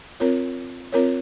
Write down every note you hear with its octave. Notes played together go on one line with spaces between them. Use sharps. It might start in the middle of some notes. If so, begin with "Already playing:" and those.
C4 F4 A#4 C#5
C4 F4 A#4 C#5